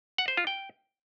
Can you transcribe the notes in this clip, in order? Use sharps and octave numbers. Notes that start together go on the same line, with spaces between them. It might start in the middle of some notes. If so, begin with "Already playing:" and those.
F#5
C5
F4
G5